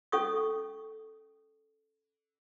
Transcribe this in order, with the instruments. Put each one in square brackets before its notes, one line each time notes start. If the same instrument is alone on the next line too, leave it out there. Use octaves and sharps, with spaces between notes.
[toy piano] C#4 A4 C#6 D#6